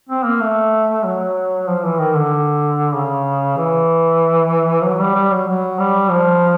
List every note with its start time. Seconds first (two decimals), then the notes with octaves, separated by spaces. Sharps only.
0.09 C4
0.25 A#3
0.41 A3
1.04 F#3
1.68 F3
1.83 E3
1.99 D#3
2.15 D3
2.94 C#3
3.57 E3
4.84 F#3
5.00 G3
5.15 G3
5.31 F#3
5.47 F#3
5.79 G3
6.11 F3